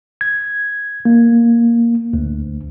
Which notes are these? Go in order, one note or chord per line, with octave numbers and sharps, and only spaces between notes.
G#6
A#3
D2